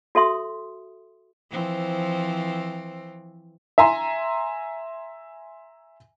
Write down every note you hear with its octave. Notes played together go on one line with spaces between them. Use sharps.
F#4 A4 E5 C6 D#6
E3 F3 C4
E5 G#5 A#5 C6